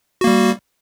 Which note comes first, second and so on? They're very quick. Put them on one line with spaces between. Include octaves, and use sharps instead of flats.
F#4 A#3 G3